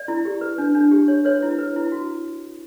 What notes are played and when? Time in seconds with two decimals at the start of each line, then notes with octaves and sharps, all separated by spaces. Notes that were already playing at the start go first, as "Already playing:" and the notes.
Already playing: D5
0.08 E4
0.25 G4
0.41 B4
0.58 D4
0.75 D4
0.91 G4
1.08 C#5
1.25 B4 C#5
1.43 E4
1.58 B4
1.76 E4
1.92 F#4